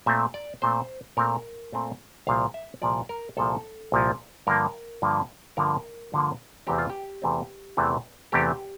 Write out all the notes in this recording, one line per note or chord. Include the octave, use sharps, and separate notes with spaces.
A#2 A3 C4 E5
D5
A#2 A3 C4 C5
A#2 A3 C4 A#4
A#2 A3 C4
C2 A#2 F3 F5
E5
C2 A#2 F3 D5
A#4
C2 A#2 F3 A4
C2 A#2 F3
G2 D3 F3 A#3 A#4
G2 D3 F3 A#3
G2 D3 F3 A#3 A#4
G2 D3 F3 A#3
E2 C3 E3 A3 C4 G4
F4
G4
E2 C3 E3 A3 C4
E2 C3 E3 A3 C4
E2 C3 E3 A3 C4 G4